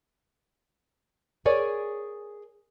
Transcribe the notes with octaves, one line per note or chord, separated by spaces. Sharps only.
G#4 A#4 C#5 D5 G#5